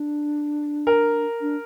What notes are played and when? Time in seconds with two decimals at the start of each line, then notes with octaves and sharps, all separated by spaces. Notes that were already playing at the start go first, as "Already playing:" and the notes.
Already playing: D4
0.87 A#4
1.41 D4